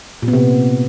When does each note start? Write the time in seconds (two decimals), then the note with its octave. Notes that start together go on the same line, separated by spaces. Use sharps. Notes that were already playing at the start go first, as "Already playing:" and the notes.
0.22 A#2
0.28 B3
0.33 C3